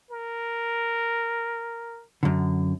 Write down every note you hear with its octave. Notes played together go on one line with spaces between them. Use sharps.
A#4
F#2 D3